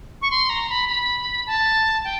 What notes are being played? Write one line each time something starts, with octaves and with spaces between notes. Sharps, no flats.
C#6
C6
A#5
B5
B5
A5
G5